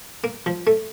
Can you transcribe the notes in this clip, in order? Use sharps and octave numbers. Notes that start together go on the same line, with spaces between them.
A#3
F3
A3